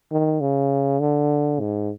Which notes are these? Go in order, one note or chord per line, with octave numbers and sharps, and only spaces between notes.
D#3
C#3
D3
G#2